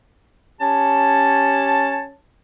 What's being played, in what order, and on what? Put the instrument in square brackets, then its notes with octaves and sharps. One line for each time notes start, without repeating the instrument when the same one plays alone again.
[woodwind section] C#4 G4 C#5 A5